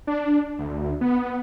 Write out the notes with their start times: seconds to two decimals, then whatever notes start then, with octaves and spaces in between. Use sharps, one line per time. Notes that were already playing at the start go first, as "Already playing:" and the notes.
0.07 D4
0.59 D2
1.01 B3